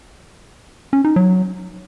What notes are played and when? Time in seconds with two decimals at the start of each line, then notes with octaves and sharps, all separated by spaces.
0.93 C#4
1.04 D#4
1.16 F#3